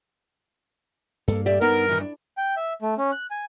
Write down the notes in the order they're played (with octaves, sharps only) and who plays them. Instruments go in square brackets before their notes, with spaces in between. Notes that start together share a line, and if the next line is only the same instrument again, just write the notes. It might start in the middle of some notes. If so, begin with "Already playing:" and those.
[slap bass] G2 A#3 [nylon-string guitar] A4
[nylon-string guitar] G4 D5 E5
[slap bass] G2 [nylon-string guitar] B3 D#4 [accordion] A#4
[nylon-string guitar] D#3 E3
D4
[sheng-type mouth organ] G5
E5
A3
C#4
F#6
G#5